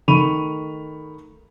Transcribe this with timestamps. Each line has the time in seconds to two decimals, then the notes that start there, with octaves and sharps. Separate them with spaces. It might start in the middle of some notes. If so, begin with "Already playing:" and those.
0.08 D#3 A3 B5 C#6 D#7 F7